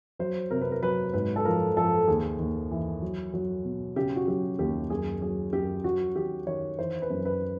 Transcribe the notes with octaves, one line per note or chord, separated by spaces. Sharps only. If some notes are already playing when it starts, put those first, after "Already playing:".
F#3 C5
C3 A#4
B4
A#4
F#3 B4
G#2 B4
A4
F3 A#4
F3 A4
D#2 G#4
D#2
E3
F#3
F#3
B2
C#3 G4
F#4
F#3 G4
D#2 G4
F#2 G#4
F#3 G#4
F#2 G4
F#3 F#4
D#3 G4
D#3 C#5
E3 C5
B4
F#2
B4